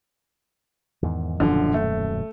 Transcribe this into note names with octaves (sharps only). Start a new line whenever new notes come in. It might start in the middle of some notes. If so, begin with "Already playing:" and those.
E2 G#2 D#3
D#1 F#2 B2 D3 F3
A3